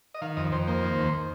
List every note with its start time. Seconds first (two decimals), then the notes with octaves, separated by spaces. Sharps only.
0.14 D#5
0.22 D#3 F5
0.37 F2 D#5
0.52 F2 C5
0.67 A#3 C5
0.83 D#3
0.98 D#2